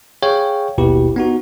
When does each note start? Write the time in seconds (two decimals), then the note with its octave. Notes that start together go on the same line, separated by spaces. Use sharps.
0.23 G#4 C#5 F5 G5
0.78 G#1 D#2 B2 E4 G4 B4
1.16 B3 D#4 F#4